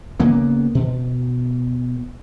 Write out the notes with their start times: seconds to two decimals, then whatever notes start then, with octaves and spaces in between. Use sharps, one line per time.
0.20 C#3 A#3 B3
0.75 B2